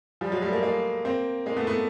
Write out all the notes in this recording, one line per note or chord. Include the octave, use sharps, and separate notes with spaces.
F3 G3
F#3 G#3
G3 A3
G#3 A#3
G#3 A#3
A#3 C4
G#3 A#3
A3 B3
A3 B3